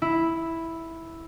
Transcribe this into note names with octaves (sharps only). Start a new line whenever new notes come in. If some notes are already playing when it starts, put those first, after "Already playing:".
E4